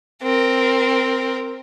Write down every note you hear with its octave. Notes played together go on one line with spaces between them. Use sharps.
C4 A#4